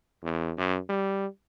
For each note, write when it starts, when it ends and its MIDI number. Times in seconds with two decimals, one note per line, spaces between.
0.23 0.52 40
0.57 0.80 42
0.89 1.26 55